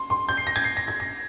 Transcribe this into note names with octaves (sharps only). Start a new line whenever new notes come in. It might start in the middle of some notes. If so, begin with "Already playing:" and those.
Already playing: C6
C6
G6
C7
A#6
G#6
C7
A#6
G#6
A#6